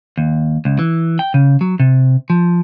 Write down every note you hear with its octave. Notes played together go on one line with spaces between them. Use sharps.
D#2
C#2
E3
G5
C#3
F#3
C3
F3